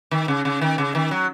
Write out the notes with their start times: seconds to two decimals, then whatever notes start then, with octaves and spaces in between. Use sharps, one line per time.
0.11 D#3
0.28 C#3
0.45 C#3
0.61 D#3
0.78 C#3
0.95 D#3
1.11 F#3